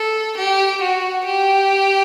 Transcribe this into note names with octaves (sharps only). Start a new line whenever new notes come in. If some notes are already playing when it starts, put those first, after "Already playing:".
Already playing: A4
G4
F#4
G4